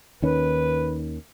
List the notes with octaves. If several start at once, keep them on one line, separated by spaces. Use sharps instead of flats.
D#2 D#3 C#4 B4